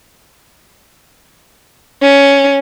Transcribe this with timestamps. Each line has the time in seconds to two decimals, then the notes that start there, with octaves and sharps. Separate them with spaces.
2.02 C#4